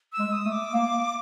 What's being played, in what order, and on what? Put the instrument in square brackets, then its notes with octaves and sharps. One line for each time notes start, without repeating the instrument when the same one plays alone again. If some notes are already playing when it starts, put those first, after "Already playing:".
[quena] E6
[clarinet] G#3
[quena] D#6
[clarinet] A3
[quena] D6
[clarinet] A#3